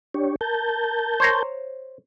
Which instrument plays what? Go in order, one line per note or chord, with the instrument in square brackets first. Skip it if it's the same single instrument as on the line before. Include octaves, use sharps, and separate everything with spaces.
[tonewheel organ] D4 G4 C#5
A#4 A5 G6
[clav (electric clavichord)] C5 C#5 A#5